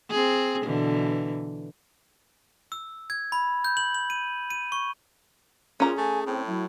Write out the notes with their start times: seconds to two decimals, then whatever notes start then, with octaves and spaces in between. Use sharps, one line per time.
0.10 C4 G#4
0.63 B2 D3 E3
2.72 E6
3.10 G#6
3.32 B5
3.64 G6
3.77 F#7
3.94 F#7
4.10 D#7
4.50 D#7
4.72 C#6
5.80 A#2 C#4 F4 G#4 A#5
5.97 A3 G#5
6.26 A2 C4
6.46 F#3 E4